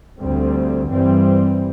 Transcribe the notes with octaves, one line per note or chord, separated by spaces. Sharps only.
D2 D3 G3 C4
G2 E3 G3 C4